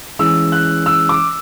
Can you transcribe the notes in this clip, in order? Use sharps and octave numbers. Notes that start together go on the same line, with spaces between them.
E3 G#3 C#4 E6
F#6
E6
D6